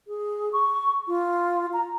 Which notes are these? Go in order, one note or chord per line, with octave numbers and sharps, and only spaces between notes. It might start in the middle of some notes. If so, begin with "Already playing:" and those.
G#4
C#6
F4
A#5